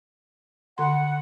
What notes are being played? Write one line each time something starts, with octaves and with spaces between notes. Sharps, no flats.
D3 F#5 C6